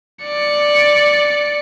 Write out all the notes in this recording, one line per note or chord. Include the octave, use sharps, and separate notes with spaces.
D5 C#7